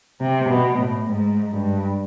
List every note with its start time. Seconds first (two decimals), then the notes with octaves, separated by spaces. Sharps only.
0.21 C3
0.49 B2
0.78 A2
1.07 G#2
1.51 G2